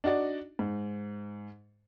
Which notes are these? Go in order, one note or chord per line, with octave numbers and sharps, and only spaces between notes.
D4 D#4 F#4 D5
G#2